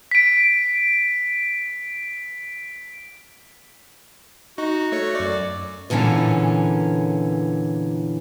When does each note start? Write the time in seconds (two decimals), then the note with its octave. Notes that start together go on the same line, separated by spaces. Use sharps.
0.11 B6 D7
4.58 D#4 F#4
4.92 A3 C#5 C#7
5.15 F#2 D5
5.90 E2 A#2 D3 E3 C#4